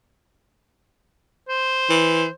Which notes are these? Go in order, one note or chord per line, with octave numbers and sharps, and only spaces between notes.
C5
E3